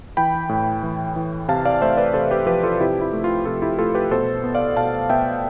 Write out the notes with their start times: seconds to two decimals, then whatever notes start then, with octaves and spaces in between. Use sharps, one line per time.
0.17 E3 G5 B5
0.49 A2
0.83 E3
1.16 E3
1.48 C3 F5 A5
1.65 D5 F5
1.82 A3 C5 E5
1.97 B4 D5
2.14 C3 A4 C5
2.31 G4 B4
2.46 F3 G4 B4
2.63 F4 A4
2.80 C3 E4 G4
3.01 E4
3.13 A3
3.24 F4
3.46 C3 F4 A4
3.62 E4 G4
3.78 A3 F4 A4
3.95 G4 B4
4.11 B2 A4 C5
4.44 B3
4.55 D5 F5
4.76 B2 F5 A5
5.10 B3 E5 G5